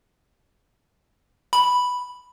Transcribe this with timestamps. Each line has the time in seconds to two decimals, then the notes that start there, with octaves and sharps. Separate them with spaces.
1.53 B5